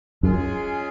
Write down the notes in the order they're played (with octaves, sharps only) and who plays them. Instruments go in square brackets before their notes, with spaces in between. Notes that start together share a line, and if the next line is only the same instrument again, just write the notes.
[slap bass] F#2 [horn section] G#3 C#4 F4 G#4